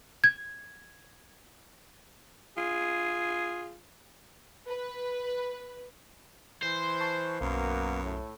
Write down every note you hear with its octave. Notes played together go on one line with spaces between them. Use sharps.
G#6
F4 G#4
B4
E3 C5
A5 C#6 C7
B1 F#2 A#3 B3
A2